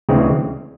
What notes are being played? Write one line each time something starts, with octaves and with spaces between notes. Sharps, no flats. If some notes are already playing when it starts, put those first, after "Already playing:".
D2 C#3 E3 G#3 C4